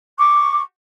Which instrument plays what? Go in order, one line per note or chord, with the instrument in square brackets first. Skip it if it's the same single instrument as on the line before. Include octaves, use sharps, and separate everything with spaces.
[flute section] C#6 D6